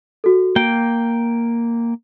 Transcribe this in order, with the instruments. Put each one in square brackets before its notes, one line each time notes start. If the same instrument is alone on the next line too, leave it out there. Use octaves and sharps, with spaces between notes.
[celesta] F#4 A4
[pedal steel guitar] A#3 G5 [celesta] D7